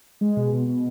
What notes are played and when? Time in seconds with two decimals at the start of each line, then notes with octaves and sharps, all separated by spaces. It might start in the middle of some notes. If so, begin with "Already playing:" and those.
0.21 G#3
0.37 B2
0.53 B2
0.68 B2